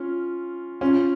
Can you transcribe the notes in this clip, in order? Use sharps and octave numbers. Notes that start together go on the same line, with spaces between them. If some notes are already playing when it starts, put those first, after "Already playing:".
Already playing: C#4 F4
C#4 F4